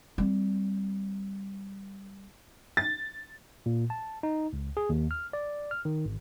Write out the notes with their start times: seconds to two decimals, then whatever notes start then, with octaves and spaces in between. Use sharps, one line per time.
0.18 G3 C4
2.77 A6
3.66 A#2
3.90 A5
4.23 D#4
4.53 C#2
4.77 G#4
4.89 D#2
5.11 F6
5.33 D5
5.71 F6
5.85 D#3
6.05 G#1